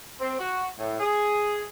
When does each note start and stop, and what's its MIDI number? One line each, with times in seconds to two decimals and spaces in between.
0.20 0.36 60
0.39 0.68 66
0.79 1.00 45
1.00 1.63 68